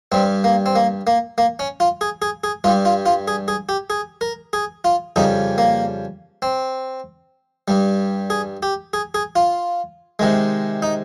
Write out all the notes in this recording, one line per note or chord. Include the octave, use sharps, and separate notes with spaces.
G2 G3 C4
A#3
C4
A#3
A#3
A#3
C#4
F4
G#4
G#4
G#4
G2 G3 F4
F4
F4
G#4
G#4
G4
G#4
A#4
G#4
F4
F2 C#3 G3 D#4
A#3
C4
G2 G3
G#4
G4
G#4
G#4
F4
C3 D#3 G#3
D#4